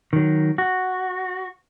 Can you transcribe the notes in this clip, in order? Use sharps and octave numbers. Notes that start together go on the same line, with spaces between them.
D#3 F#3
F#4